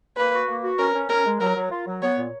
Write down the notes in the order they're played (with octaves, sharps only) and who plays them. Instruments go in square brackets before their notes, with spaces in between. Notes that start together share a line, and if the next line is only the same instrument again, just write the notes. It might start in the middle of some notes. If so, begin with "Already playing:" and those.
[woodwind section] A#3 [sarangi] B4
[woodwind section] F#4
A#3
F#4
[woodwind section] C#4 [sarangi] A#4
[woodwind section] C#4
[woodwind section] C#4 [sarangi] A#4
[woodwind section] G#3
[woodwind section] F#3 [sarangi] A#4
[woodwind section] F#3
F4
F#3
[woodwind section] B3 [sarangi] C#5
[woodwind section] A#2